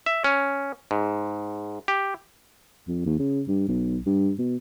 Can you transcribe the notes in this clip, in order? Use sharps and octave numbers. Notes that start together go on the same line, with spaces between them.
E5
C#4
G#2
G4
F2
D#2
C#3
G2
B1
G2
B2